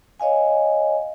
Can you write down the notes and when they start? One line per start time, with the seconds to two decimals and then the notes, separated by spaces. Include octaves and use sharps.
0.20 C#5 D#5 F5 G#5